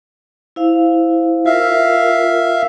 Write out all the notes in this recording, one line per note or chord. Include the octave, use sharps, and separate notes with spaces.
E4 C5 F5
F4 A#4 E5 F5